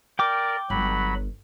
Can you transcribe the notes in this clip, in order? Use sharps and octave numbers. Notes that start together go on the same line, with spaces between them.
A#4 D5 G5 D6
G1 F#3 B5